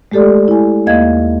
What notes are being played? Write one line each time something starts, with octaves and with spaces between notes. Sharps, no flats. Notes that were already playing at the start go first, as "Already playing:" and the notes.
G#3 A3 G4 A4 D5
E4 G#5
D#2 A#3 D#5 F5 G#6